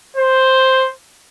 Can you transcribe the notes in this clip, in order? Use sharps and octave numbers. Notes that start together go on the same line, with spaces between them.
C5